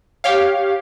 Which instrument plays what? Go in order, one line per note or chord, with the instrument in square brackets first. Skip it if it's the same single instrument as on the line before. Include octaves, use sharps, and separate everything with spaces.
[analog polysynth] G4 C#5 F5